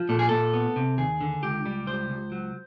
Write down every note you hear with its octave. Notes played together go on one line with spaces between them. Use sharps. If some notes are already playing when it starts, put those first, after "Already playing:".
Already playing: F3
A#2 A4
G#4
A#2 A4
B3
C3
D#2 G#4
D3
C#2 G4
G3
C#2 C5
C#2
F#3